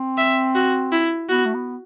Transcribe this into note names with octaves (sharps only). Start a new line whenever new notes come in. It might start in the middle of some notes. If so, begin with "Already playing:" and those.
Already playing: C4
E5
F#4
E4
B3 F#4
A3
B3